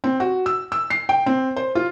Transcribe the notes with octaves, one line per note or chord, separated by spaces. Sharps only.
C4
F#4
E6
E6
C7
G5
C4
C5
F4